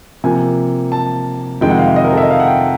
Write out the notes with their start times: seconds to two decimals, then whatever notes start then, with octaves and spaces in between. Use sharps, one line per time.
0.24 C3 F3 A#3 G#5
0.92 A5
1.61 F2 C3 D#3 G#3 G5
1.69 F#5
1.79 F5
1.87 E5
1.96 D#5
2.04 A#4
2.13 A4
2.17 E5
2.22 D#5
2.31 F5
2.40 F#5
2.47 G5